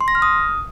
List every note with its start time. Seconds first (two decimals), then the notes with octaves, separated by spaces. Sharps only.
0.01 C6
0.08 A#6
0.15 F6
0.22 D#6